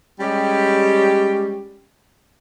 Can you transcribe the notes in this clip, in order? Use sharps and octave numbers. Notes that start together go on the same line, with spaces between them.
G3 G#3 C#4 G4